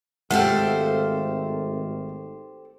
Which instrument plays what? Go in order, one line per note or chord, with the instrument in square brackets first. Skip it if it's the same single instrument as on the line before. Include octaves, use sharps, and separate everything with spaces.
[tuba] G#1 [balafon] G#3 [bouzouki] A3 F5 [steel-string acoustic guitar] G4 A4 C5